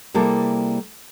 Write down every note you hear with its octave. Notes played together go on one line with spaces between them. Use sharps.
C3 G3 A#3 E4 G#4 A4